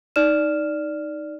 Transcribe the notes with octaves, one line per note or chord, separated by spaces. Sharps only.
D#4 D5 F6 E7